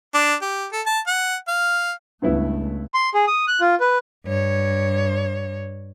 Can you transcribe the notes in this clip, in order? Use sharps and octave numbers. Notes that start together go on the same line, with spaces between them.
D4
G4
A4
A5
F#5
F5
C#2 G2 A3 B3 E4
C6
G#4
D#6
F#6
F4
B4
G2 C#5